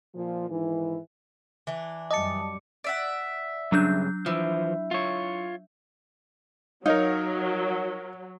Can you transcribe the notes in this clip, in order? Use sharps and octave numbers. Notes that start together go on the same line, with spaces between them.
A#2 F3
G#2 D#3 E3
E3 D4
F#2 G3 D#5 A5 D6 C#7
D5 E5 F#5
G2 C#3 F#3 D4 G6
E3 F3 E4
F4 C#5
F#3 D#4 A#4 C#5 F5